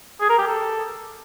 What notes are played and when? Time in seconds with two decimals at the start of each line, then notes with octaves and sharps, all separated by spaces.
0.21 G#4
0.30 A#4
0.39 G4
0.47 A4